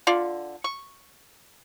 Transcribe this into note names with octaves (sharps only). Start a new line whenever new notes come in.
D3 F4 D5
C#6